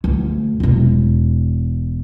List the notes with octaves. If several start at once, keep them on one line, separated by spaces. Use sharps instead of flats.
D2
E1 E2